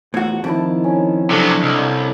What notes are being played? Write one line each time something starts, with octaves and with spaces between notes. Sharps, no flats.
E2 A2 F3 F#4 A#5
F2 D#3 E4 A5 D6
C#4
C3 F#3 D4 A4
C2 D#5